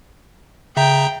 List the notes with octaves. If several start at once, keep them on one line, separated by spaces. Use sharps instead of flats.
C#3 E5 G5 A#5